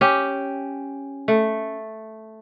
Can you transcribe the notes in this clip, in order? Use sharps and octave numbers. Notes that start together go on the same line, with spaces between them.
C#4 G4
A3